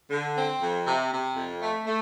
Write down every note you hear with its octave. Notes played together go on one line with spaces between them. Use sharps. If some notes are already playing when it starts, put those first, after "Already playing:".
D3
C4
F2
C3
C3
F2
A3
A3